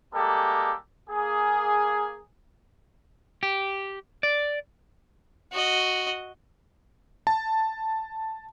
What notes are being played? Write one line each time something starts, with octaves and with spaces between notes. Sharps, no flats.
G3 G#3 A#3 G4 A4
A#3 G#4
G4
D5
F#4 D#5
A5